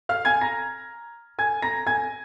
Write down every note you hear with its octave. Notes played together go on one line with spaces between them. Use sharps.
F5 F6
G#5 G#6
A#5 A#6
G#5 G#6
A#5 A#6
G#5 G#6